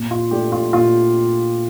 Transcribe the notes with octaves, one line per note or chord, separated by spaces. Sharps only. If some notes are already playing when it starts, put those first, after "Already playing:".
Already playing: A#2
F4
A3 D4 G4
F4
A#2 F4